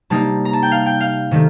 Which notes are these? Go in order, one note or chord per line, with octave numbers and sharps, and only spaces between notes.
C3 G3 A#3 D#4 A5
A#5
A5
G5
F5
G5
F5
C3 D#3 A3